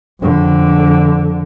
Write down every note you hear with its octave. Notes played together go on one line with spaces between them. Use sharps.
F2 D3